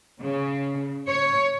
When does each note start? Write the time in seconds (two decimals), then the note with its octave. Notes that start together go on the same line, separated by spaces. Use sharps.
0.22 C#3
1.09 C#5